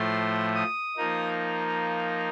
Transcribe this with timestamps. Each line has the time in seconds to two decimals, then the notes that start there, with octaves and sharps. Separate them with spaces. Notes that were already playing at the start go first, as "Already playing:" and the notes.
Already playing: A2 F3 A3 C6
0.55 D#6
0.96 F3 A#3 D#4